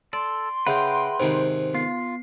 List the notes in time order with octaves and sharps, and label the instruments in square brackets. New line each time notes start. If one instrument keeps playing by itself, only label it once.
[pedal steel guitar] A4 [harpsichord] D5 [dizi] C6
[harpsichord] C#3 [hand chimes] G#4 E5 F#5 [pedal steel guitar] B4 G5
[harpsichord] G#2 C3 D#3 [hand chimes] C5
[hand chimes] B3 C7 [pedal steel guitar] F4